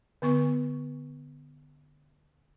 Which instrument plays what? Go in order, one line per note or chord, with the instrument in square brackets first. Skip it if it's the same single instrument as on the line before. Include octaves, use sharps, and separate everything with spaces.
[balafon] D3 B3 C#6